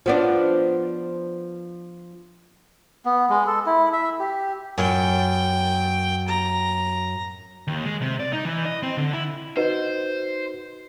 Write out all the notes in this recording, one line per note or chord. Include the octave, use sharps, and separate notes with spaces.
F3 B3 D4
B3
G#3
A4
E4
E5
G4
F#2 G5
A#5
D#2
G#3
C3
D5
D#4
E3
D#5
C4
D3
E4
D#4 F#4 B4 C5 D#5